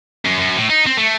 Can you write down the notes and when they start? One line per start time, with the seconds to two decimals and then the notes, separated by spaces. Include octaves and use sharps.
0.25 F#2
0.38 F#2
0.57 A2
0.70 D#4
0.87 C4
0.98 A3